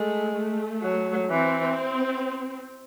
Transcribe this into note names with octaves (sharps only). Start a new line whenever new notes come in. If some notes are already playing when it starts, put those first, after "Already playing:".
Already playing: G#3 A3
A3
F#3
E3 C4